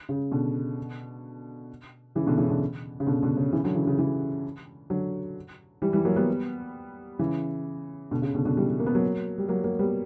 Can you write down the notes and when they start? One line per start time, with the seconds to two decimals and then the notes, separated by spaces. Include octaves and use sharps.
0.09 C#3
0.32 B2 D3
2.15 C#3 E3
2.27 B2 D3
2.38 C#3 E3
2.50 B2 D3
3.00 C#3
3.07 B2 D3
3.23 B2 D3
3.37 C#3
3.52 C#3 E3
3.64 D3 F#3
3.75 C#3 E3
3.87 C#3
3.99 C#3 E3
4.90 D3 F#3
5.82 E3 G3
5.93 E3 G3
6.05 F#3 A#3
6.16 G3 B3
7.19 C#3 E3
8.11 B2 D3
8.22 C#3
8.34 B2 D3
8.45 B2 D3
8.57 E3 G3
8.79 A#3
8.86 B3
8.95 F#3 A#3
9.38 G3
9.48 F#3 A#3
9.64 F#3 A#3
9.79 G3 B3